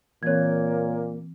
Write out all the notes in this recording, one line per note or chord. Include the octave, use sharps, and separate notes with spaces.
A#2 E3 A#3 C4 C#5 G#6